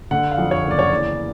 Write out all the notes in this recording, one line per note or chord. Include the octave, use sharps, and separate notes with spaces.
D3 F#5
F5
F2
C#5
F#1
D5
C#5
E2 D5